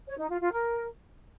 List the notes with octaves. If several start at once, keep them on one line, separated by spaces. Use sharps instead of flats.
C#5
D#4
F4
F4
A#4